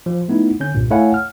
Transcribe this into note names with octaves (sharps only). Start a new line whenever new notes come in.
F3
A3 B3 D#4 E4
D3 C#4 G6
C2 G2 A#2
A3 E4 C#5 F5 F#5 G#5
F6